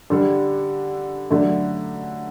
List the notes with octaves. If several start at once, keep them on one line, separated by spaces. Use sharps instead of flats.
D3 G3 D4 A4
D3 F#3 A3 D4